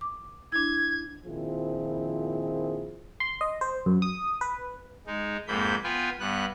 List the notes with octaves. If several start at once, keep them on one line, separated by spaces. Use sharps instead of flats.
D6
D4 E4 G#6
A#1 D#3 F3 C4 E4 G#4
C6
D#5
C5
F#2
D#6
B4
G#3 D#4
F2 G#2 A#3 B5 G6
B3 F4 B4 G5 G#5
G2 B3 F#6